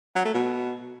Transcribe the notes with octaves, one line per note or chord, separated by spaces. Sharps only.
F#3
A3
B2